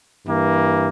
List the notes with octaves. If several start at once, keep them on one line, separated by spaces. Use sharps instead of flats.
G2 E3 A#3